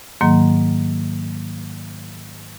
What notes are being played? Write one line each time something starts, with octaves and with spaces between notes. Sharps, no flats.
G#2 D#3 F#3 A#3